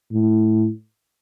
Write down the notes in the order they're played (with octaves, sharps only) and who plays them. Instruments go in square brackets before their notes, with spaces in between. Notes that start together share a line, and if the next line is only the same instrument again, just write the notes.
[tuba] A2